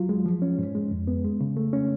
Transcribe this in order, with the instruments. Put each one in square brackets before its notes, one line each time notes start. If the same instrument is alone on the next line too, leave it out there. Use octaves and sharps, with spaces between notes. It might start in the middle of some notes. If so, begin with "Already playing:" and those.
Already playing: [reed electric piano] F#3 F4
G#3
F3
C#4
G#2
G#3
F2
B3
G#3
C#3
A3
C#4